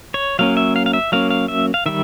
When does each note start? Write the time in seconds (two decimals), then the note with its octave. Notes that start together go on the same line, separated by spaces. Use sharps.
0.14 C#5
0.39 F#3 A#3 C#4 F5
0.57 E5
0.76 F5
0.86 F5
0.93 E5
1.12 F#3 A#3 C#4 F5
1.30 F5
1.48 E5
1.74 F5
1.86 D#3 G3 E5